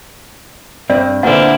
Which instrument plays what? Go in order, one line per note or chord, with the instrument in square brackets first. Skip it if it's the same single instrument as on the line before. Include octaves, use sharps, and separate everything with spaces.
[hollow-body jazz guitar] G2 C4 [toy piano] D5
[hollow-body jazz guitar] A#2 D3 [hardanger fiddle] C4 E4 [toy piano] B4 F#5